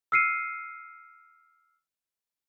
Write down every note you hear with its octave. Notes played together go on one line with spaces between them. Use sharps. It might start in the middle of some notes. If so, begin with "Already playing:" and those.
E6 F6 C7 C#7 D#7